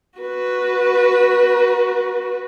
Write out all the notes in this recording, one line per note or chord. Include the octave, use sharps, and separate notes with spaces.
F#4 B4